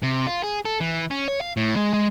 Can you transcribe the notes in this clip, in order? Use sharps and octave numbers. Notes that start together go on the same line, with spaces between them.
C3
F4
G#4
A4
E3
C#4
C#5
F5
A2
G#3
G#3